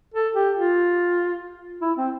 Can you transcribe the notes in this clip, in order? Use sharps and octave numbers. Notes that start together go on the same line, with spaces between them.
A4
G4
F4
E4
C4